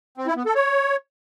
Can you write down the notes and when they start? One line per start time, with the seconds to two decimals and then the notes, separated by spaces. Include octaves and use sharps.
0.17 C4
0.27 E4
0.36 B3
0.46 A4
0.55 C#5